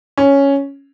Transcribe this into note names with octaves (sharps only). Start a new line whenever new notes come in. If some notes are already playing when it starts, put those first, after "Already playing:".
C#4